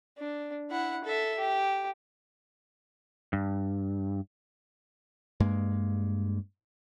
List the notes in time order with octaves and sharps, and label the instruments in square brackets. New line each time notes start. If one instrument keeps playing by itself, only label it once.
[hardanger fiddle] D4
E4 F#5
A4 E5
G4
[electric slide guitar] G2
[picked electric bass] G2 G#3 A#3